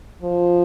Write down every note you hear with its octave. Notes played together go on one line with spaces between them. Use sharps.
F3